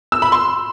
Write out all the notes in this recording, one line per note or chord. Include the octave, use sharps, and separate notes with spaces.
E6
B5
C6